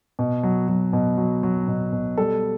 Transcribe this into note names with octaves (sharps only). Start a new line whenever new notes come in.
B2
F#3
F#3
B2
F#3
F#3
B2
B2
G3 A4